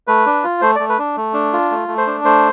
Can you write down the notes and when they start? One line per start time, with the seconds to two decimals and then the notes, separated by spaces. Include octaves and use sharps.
0.07 A3 B4
0.26 D4
0.44 F4
0.61 A3 C5
0.76 A3 D5
0.89 B4
0.98 D4
1.17 A3
1.34 D4
1.53 F4
1.71 A3
1.88 A3
1.98 C5
2.07 D4
2.24 A3 C5